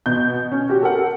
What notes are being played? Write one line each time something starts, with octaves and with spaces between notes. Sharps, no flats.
B2 G6
C#4
F#4 G4
A4 A#4 F#5